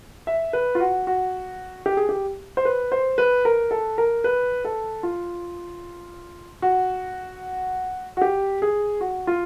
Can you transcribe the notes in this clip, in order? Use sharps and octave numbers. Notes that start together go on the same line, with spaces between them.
E5
B4
F4
F#4
F#4
G4
G#4
G4
C5
B4
C5
B4
A#4
A4
A#4
B4
A4
F4
F#4
F#4
G4
G#4
F#4
F4